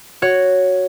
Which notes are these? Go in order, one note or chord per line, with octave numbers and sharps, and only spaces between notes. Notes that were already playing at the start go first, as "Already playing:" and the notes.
F#4 C#5